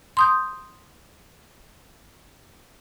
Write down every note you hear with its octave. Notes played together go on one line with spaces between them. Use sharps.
C6 D#6 G6